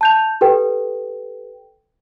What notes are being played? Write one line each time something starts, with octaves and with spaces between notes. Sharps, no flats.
A5 G6 F7
G4 A4 B4 G5